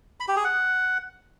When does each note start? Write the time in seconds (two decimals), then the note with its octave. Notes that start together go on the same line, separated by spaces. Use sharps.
0.20 B5
0.28 G4
0.36 G#4
0.45 F#5